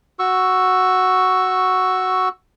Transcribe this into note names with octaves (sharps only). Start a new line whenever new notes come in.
F#4 C#6 E6